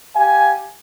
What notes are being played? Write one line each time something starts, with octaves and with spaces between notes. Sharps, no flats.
G4 F5 G#5